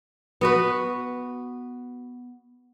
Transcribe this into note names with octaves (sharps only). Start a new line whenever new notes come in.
B3 F#4 B4